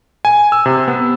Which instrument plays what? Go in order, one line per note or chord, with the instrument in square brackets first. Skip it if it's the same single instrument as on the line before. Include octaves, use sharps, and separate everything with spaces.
[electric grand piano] G#5
E6
C3
B3